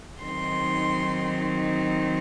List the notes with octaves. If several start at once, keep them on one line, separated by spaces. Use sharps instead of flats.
D#3 F#3 C4 D#4 C6